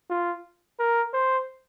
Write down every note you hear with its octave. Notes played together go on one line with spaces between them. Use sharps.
F4
A#4
C5